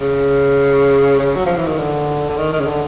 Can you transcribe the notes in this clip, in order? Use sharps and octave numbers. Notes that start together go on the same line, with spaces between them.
C#3
C#3
F#3
F3
E3
D#3
D3
D3
D#3
D#3
C#3
D3